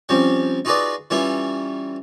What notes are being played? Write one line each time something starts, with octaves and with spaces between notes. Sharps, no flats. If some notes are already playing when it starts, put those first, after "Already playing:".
F3 G3 C4 C#4
D#4 F4 F#4 G#4 B4 D5
E3 G3 C#4 E4 F4